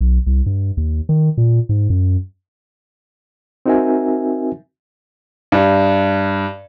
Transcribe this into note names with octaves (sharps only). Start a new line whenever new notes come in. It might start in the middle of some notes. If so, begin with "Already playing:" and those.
B1
C2
G2
D#2
D#3
A#2
G#2
F#2
C4 D#4 F#4 A#4 E5 G#5
G2